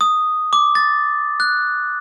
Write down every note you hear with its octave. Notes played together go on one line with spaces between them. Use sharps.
D#6
D6
A6
F#6